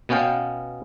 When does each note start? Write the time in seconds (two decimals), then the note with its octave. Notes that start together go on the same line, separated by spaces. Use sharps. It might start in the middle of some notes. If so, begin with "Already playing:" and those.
0.09 B2 B3 C#4 F5 G5